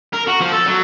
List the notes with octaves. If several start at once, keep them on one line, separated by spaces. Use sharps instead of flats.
A#4
F#4
F3
A4
F#3